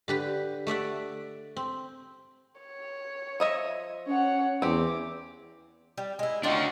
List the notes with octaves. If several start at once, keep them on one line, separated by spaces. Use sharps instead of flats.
D3 G4 B4
A3 D5 E5 F#5
C4
C#5
F3 D#5 E5
C#4 C#5 F#5
E2 C4 G4 D6
G3
G#3 E4
D#3 C#4 D4 F4 F#4